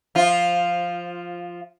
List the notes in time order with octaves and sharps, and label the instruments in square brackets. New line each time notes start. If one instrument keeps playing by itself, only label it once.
[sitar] F3 F4